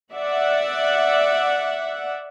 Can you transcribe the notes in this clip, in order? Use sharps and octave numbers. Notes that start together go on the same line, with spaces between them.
D5 E5 F#5